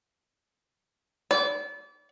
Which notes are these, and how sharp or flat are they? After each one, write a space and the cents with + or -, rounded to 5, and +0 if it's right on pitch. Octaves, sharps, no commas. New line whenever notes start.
D5 -30